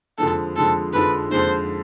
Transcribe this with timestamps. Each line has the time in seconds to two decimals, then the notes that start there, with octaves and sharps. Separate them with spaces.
0.18 F2 D3 F3 G#3 A4
0.56 F2 D3 F3 G#3 A4
0.93 F2 D3 F3 G#3 B4
1.30 F2 D3 F3 G#3 C5